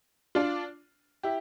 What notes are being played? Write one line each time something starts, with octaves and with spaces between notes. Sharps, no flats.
D4 F4
E4 G4